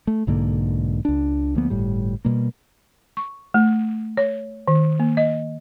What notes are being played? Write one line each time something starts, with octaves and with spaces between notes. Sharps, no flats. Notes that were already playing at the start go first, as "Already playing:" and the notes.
A3
B1 G#2 D3 A#3
C#2 D4
D2 F3 A#3 B3
G1 A2 G3
B2 G3 A#3
C#6
A3
C#5
D#3
A#3
D#5